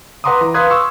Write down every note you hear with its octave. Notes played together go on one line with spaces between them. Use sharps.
B4 F#5 A#5 C6 D6 D#6
E3 A#5
B4 F5 C6 D#6 F#6 G#6
C6 C#6 D#6 E6